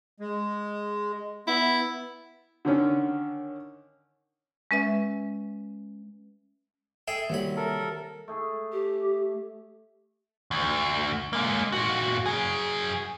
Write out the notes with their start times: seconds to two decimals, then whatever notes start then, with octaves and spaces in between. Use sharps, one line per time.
0.20 G#3
1.48 B3 E4
2.65 D3 D#3 C#4
4.71 G#3 C#4 B4 E5
7.08 G#4 A4 E5 G5
7.30 C2 D#3 F#3 A#3 B5
7.57 A4 A#4
8.28 A3 G#4
8.72 G4
10.51 D2
11.33 G#3 A#3
11.72 A#2 F#4
12.26 F#3 G#4